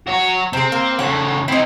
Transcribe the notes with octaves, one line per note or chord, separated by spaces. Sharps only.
F#4 C#5
C3 C4 G#4
A#3
C#3 A3 C#5 F#5
C4 D#4 E4 C5